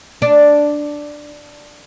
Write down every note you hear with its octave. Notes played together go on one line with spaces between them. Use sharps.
D4